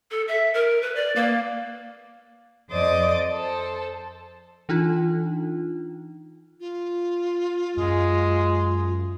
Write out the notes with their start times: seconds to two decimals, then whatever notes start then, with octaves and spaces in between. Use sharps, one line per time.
0.11 A4
0.28 E5
0.54 A#4
0.82 B4
0.95 D5
1.16 A#3
2.71 F2 C5 D5 D#5 D6 D#6
3.33 A4 C5
4.69 E3 D4 D#4 F4
6.60 F4
7.77 F#2 G#3